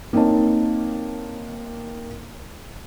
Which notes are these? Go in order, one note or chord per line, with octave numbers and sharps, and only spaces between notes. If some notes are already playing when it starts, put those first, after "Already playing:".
A#3 C4 D#4 C#5 A5